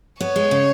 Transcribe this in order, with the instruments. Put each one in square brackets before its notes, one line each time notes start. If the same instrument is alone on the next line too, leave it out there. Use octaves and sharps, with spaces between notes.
[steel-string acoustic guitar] B3 [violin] C#5
[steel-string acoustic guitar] G#3
C#3